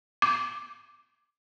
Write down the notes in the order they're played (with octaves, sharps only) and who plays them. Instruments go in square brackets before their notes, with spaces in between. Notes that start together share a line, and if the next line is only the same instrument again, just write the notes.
[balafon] D6